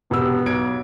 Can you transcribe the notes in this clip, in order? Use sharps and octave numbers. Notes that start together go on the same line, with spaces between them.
E1 C3 B3 E6
B1 G#6 D7